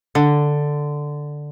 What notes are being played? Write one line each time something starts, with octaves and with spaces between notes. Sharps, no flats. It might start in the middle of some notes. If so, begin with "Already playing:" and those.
D3